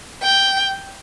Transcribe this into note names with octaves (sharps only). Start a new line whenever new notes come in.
G5